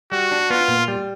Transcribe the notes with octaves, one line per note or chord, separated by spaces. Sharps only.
G3 F#4
D4
B3 F4
A#2
G3